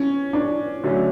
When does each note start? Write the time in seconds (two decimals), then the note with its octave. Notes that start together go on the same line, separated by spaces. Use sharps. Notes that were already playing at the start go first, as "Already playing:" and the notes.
Already playing: C#4
0.33 D4
0.84 D3 F#3 A3 C#4